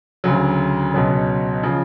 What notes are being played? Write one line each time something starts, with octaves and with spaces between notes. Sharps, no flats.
D2 C#3 F#3
C#2 B2 F#3
C#3 F3